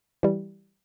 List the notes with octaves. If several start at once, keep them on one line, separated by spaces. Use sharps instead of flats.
E3 G3